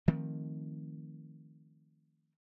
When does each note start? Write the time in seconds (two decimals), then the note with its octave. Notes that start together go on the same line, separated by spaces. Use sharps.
0.08 D#3 F3 A3 C4